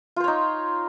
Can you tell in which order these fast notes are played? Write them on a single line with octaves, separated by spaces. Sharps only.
F4 C5 C#5 D#4